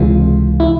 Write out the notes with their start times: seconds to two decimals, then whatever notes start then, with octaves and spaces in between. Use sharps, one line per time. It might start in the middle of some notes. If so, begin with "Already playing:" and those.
Already playing: C#2 C3 E3 G#3 F4
0.60 E4